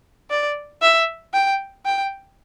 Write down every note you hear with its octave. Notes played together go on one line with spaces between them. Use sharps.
D5
E5
G5
G5